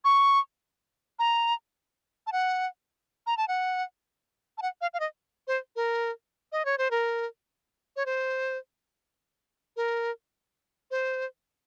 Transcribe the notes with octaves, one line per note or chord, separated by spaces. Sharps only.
C#6
A#5
A5
F#5
A#5
A5
F#5
A5
F#5
F5
F5
D#5
C5
A#4
D#5
C#5
C5
A#4
C#5
C5
A#4
C5